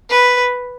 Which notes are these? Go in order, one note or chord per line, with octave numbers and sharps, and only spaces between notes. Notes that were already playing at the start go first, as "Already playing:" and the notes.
B4